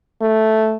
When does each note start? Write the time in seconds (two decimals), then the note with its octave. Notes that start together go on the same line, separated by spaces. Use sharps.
0.22 A3